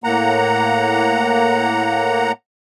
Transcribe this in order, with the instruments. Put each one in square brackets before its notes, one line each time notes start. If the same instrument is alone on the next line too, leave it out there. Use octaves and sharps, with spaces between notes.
[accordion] A2 A#3 F#5 A#5